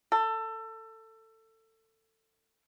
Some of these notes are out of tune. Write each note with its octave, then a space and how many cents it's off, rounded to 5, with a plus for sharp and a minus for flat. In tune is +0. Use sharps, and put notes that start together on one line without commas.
A4 +20